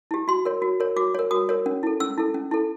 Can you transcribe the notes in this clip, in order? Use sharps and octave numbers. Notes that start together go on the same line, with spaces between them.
E4 G4
F#4 C6
A#4 C#5
F#4
A#4 C#5
F#4 D6
A#4 C#5
F#4 D#6
A#4 C#5
C#4
E4 A4
C#4 E6
E4 A4
C#4
E4 A4